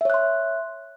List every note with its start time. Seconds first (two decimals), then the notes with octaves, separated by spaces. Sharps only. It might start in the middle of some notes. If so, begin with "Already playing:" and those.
0.01 E5
0.05 C#5
0.10 F#6
0.14 C6